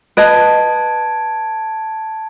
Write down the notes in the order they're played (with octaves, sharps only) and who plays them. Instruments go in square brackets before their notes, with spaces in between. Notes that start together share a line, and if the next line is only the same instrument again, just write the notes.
[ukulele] B4 D#5 [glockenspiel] A5 G#6 D7